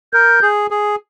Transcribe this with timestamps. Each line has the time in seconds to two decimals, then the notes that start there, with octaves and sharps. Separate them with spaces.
0.13 A#4 G6
0.42 G#4
0.71 G#4